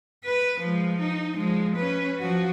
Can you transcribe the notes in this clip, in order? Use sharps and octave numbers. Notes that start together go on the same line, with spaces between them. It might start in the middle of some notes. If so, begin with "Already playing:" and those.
B4
F3 G#3
D#4
F3 G#3
C#4 B4
F3 F#4